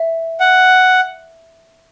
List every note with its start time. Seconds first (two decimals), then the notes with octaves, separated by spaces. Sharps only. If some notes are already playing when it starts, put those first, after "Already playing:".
Already playing: E5
0.40 F#5